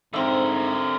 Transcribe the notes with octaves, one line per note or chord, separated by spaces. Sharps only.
G#2 D3 C4 A#4 E5